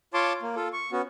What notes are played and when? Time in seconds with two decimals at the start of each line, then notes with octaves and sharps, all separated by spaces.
0.14 F4 C#5 A5 C6 D6
0.42 A#3
0.56 F4 A4
0.73 C#6
0.92 B3 C#4 F#4